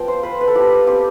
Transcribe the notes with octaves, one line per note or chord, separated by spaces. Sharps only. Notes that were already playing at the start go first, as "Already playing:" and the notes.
Already playing: F3 B3 G5
C5
F4 B4
B4
A4
F3 G4
C4 G4